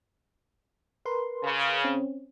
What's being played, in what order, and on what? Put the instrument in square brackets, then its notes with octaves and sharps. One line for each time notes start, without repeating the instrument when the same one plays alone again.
[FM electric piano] A#4 B4 C6
[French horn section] C#3
[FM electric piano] C4 C#4